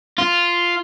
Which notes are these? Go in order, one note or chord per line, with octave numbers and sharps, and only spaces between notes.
F4